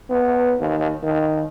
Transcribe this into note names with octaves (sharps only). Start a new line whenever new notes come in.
B3
D#2
D#3